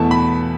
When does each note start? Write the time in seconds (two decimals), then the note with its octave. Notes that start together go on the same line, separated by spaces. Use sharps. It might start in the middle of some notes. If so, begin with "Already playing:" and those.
Already playing: E2 B2 A3 A5
0.11 B5